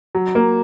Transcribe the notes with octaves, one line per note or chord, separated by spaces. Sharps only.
F#3
A#3